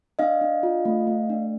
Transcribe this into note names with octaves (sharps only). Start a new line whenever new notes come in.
D4 D#5 F5
D4
F4
A3
A3
D4